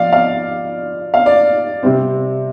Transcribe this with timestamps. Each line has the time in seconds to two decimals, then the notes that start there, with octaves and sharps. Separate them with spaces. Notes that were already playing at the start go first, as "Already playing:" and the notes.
Already playing: F3 F4 D5 F5
0.12 F5
1.14 F5
1.26 D5
1.83 C3 G3 C4